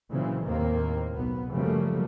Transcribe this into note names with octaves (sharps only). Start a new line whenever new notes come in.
A#2 C#3 E3 F#3 C4
D#2 A2 D#3 A#3 C4
B1 B3
F#2 C#3 F3 G3 A3 A#3